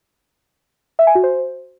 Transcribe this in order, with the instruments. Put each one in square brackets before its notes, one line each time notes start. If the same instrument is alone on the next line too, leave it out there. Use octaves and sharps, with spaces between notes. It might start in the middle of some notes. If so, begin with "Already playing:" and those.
[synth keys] E5
G#5
F#4
C5